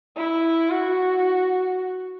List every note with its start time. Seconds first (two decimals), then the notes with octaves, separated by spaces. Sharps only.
0.16 E4
0.70 F#4